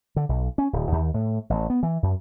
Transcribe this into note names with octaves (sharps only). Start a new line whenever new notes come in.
D3
B1
C#4
D1
D#2
A2
A1
B3
E3
F#2